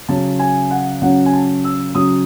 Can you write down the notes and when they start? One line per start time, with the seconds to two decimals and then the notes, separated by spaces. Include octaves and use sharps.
0.08 C#3 F#3 C#4 A5
0.39 G#5
0.71 F#5
1.02 C#3 F#3 C#4 F#5
1.26 G#5
1.33 A5
1.64 E6
1.95 C#3 F#3 C#4 D#6